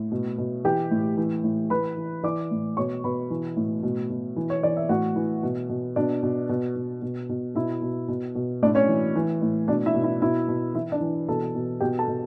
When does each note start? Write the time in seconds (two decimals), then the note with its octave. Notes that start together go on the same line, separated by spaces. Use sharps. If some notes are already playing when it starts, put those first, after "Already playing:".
Already playing: A2
0.12 B2
0.38 B2
0.65 E3 G4 G5
0.91 A2
1.17 E3
1.44 A2
1.70 E3 B4 B5
1.97 E3
2.23 E3 D5 D6
2.51 A2
2.77 B2 C#5 C#6
3.04 B2 B4 B5
3.30 E3
3.57 A2
3.83 B2
4.10 B2
4.36 E3
4.50 C#5
4.63 E3 D5
4.77 E5
4.89 A2 F#4 F#5
5.16 E3
5.43 B2
5.69 B2
5.96 B2 D4 D5
6.23 B2
6.49 B2
6.76 B2
7.02 B2
7.29 B2
7.55 B2 E4 E5
7.82 B2
8.08 B2
8.35 B2
8.63 A2 D4 D5
8.75 C#4 C#5
8.88 E3
9.16 E3
9.42 A2
9.68 B2 D4 D5
9.86 E4 E5
9.95 B2
10.04 E4 E5
10.22 B2 E4 E5
10.48 B2
10.74 E3 E4 E5
10.92 D4 D5
11.01 E3
11.28 B2 A4 A5
11.55 B2
11.80 B2 G4 G5
11.99 A4 A5
12.08 B2